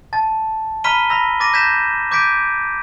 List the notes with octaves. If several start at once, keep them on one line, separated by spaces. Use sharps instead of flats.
A5 A6
A#5 B5 F6 B6 D#7 G7
B5 E6 A#6
D6 A6 A#6 D#7
G6 G#6 A#6 B6 E7
D6 G6 G#6 B6 D7 D#7